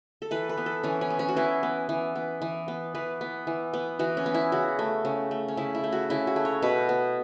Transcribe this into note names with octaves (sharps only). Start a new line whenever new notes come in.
A4
E3 B4
B4
B3
A4
E3 C#4
C#4
B3
C#4
F#4
E3 E4
B3
E3
B3
E3
B3
E3 B4
B3
E3
B3
E3 F#4
C#4
B3
E4
C#3 F#4
A3
C#3
A3
C#4
C#3 E4
E4
A3
F#4
C#3 E4
F#4
A3
C#5
B2 B4
B3